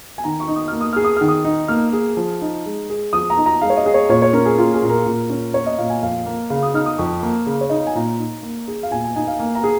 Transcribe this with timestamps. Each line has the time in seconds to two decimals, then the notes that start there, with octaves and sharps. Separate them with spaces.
0.18 G#5
0.24 D#3 A#5
0.40 C#6
0.48 D#4
0.56 D#6
0.68 A#3 F6
0.81 D#6
0.93 G#4 F6
1.05 D#6
1.17 D#3 F6
1.28 D#6
1.45 D#4
1.68 A#3 F6
1.93 G#4
2.17 F3
2.42 D#4
2.66 G#3
2.90 G#4
3.13 F3 D#6
3.30 A#5
3.38 D#4
3.46 A#5
3.61 G#3 F5
3.70 C#5
3.77 D#5
3.86 G#4
3.94 C#5
4.09 A#2 C#5
4.22 C#5
4.33 C#4 A#4
4.45 G#4
4.58 A#3 F4
4.74 G#4
4.82 A#2
4.89 A#4
5.06 A#2
5.30 C#4
5.54 A#3 C#5
5.66 D#5
5.78 A#2 F5
5.90 G#5
6.03 F2 F5
6.26 A#3
6.50 C#3 F5
6.63 D#6
6.74 D#4 F6
6.86 D#6
6.98 F2 C#6
7.23 A#3
7.46 C#3
7.61 C#5
7.69 D#4 D#5
7.78 F5
7.87 G#5
7.95 A#2 A#5
8.19 D#4
8.43 A#3
8.68 G#4
8.83 F5
8.91 A#2 G#5
9.04 G#5
9.16 D#4 G#5
9.28 F5
9.39 A#3 G#5
9.55 A#5
9.64 G#4